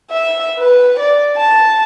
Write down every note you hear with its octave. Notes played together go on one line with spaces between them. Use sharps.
E5
B4
D5
A5